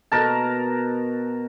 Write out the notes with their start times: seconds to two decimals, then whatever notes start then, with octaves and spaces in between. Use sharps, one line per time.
0.12 B2 A#4 A5